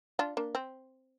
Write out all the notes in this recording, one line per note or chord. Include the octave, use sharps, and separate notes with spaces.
D4 F4
A#3 D4
C4